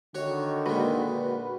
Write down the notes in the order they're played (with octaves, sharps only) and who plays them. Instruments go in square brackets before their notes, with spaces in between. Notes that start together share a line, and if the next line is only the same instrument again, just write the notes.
[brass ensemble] D3 D#3 [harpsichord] F#4 C#5
[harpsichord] A#2 G#3 [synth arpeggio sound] F#4 B4